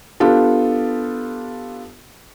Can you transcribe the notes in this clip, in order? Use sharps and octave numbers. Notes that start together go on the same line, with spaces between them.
B3 D4 F4 G4 A4